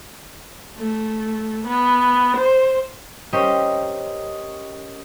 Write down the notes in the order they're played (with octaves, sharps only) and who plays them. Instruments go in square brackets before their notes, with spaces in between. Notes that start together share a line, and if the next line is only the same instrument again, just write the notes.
[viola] A3
B3
C5
[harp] C#4 G4 A#4 C5 D#5